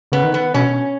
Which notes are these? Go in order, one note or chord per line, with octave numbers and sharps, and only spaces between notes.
C#3 B3
D#3
B3
B2 C#4